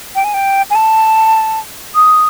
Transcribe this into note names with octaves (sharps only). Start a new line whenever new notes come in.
G5
G#5
G5
G#5
A5
D#6